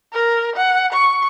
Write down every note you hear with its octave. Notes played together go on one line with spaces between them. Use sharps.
A#4
F#5
C#6